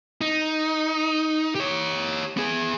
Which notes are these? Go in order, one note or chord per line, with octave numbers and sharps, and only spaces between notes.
D#4
G4 C#5
B3 G#4